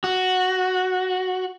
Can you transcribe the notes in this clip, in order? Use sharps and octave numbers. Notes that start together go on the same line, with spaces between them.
F#4